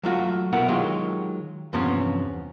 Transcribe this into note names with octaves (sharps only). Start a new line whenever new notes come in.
F#3 A3 F4 F#4
C2 B2 B3 E4 A#4 F#5
D#3 F#3 G#3 F4 G4
E2 G2 C3 F3 B3 C#4